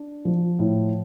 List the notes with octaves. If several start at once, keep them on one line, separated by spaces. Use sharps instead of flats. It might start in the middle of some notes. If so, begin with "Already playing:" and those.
Already playing: D4
F3
A2